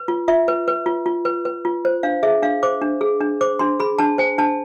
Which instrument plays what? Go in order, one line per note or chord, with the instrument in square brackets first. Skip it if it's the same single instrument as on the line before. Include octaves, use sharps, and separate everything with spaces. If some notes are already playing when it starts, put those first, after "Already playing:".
Already playing: [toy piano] B4
F4
F4 E5
B4
B4
F4
F4
B4
B4
F4
C5
D4 F5
G#4 E5
D4 F5
C5 D6
D4
G#4
D4
C5 D6
D4 C6
G#4 B5
D4 A5
C5 G#5
D4 A5